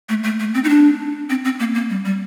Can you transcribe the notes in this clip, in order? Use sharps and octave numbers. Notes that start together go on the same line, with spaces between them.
A3
A3
A3
C4
D#4
D4
C4
C4
A#3
A#3
G3
G3